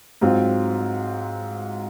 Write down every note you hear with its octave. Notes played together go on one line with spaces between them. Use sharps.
G#2 F#3 C4 F4